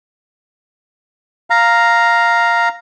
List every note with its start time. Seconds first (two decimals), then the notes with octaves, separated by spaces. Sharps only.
1.50 F5 A#5